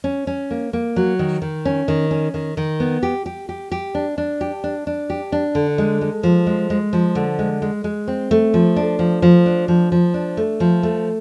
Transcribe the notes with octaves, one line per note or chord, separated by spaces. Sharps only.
C#4
C#4
A#3
A#3
F#3
D#3
D#3
C#4
D#3
C#4
D#3
D#3
B3
G4
G4
G4
G4
D4
D4
G4
D4
D4
G4
D4
D3
G#3
G#3
F3
G#3
G#3
F3
D3
G#3
G#3
G#3
C4
A3
F3
D4
F3
F3
D4
F3
F3
D4
A3
F3
A3